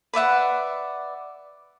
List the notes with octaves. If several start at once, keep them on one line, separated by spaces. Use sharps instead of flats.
B4 D5 E5 F#5